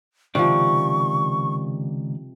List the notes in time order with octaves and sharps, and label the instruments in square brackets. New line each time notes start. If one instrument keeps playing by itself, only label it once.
[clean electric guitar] C#2 D#3 D5 [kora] C3 F3 [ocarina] C#6